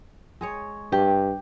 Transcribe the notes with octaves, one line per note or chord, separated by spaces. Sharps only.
G#3 G#4 C#5
G2 G4